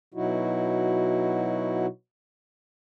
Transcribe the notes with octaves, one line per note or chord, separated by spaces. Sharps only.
B2 F#3 D#4 E4 F#4